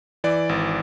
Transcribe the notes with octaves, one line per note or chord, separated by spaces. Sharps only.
E3 D5
G#1